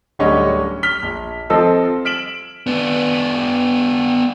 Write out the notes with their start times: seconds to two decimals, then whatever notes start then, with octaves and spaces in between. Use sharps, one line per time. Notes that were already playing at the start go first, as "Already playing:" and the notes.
0.19 D1 D3 G3 C#4 C#5 D#5
0.83 F6 B6 G7
1.03 A#1
1.50 F3 C4 A4 D#5 E6
2.05 F6 B6 D7 E7 F#7
2.67 B3 D4